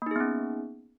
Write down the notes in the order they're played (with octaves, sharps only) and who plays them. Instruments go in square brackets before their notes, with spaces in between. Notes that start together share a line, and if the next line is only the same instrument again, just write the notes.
[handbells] A#3
D#4
G#4
B3
C#4